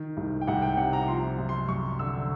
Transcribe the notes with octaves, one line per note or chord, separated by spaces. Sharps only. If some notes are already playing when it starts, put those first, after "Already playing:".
Already playing: D#3
C2
G5
C2 F#5
G5
C3 F#5
A#5
F3 C6
F#2
C6
F#2 C#6
D3 E6